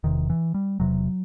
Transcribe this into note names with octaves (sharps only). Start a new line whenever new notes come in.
E1 E2 C3 D#3
E3
G3
E1 E2 C3 F#3